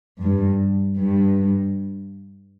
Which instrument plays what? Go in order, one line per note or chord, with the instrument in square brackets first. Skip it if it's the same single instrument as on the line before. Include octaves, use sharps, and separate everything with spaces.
[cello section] G2
G2